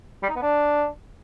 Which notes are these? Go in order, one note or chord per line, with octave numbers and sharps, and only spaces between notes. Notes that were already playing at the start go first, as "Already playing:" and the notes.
G3
D#4
B3
D4